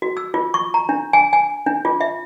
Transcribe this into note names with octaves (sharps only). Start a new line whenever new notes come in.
F#4
E6
F4
C#6
A#5
D4
G#5
G#5
D4
F4
E5